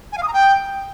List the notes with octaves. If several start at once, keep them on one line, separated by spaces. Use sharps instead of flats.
G#5
F5
D#6
A#5
G5